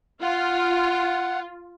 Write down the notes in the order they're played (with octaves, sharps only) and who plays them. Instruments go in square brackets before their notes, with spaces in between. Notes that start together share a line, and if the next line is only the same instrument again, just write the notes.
[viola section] F4 [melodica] F#5